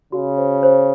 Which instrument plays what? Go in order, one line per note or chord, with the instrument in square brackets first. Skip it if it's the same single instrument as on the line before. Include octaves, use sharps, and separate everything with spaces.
[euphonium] C#3 [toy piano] F#4
[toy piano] C5
C5